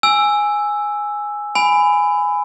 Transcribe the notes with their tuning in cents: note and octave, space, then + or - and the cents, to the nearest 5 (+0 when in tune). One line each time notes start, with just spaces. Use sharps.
G#5 +0 E6 +0
G#5 +0 B5 +20